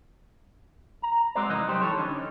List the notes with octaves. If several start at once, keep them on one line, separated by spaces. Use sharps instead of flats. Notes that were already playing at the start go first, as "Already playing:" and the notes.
A#5
G#3 C4 F#4 A#4 C5 D5
C2 F2 E3 D#4 D#5
F#3 G3 D#4 G4 C5
E3 A4 C#5
D3 C#4 D#4